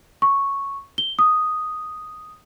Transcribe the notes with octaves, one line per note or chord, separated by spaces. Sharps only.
C#6
G7
D#6